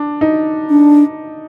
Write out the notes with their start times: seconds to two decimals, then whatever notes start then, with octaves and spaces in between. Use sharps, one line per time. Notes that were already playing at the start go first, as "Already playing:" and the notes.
Already playing: D4
0.21 D#4
0.70 D4